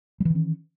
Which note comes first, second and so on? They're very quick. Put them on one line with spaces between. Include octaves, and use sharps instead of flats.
G3 E3 D#3 C#4